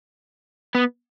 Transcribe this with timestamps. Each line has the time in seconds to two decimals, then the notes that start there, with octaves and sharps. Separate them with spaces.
0.75 B3